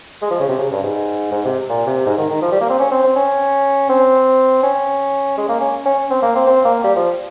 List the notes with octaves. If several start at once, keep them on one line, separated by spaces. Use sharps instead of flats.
G#3
F3
C#3
C3
C#3
G2
G#2
G#2
C3
A#2
C3
G#2
D#3
D#3
F3
G3
A#3
C4
C#4
C4
C4
C#4
C4
C#4
G#3
A#3
C#4
C#4
C4
A#3
C4
C4
A#3
G3
F3